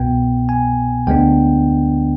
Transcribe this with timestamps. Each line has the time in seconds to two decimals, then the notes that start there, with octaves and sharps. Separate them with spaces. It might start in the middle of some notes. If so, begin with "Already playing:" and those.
Already playing: C2 B2 B3 G5
0.49 G#5
1.07 D2 D3 G#3 B3 D4 G5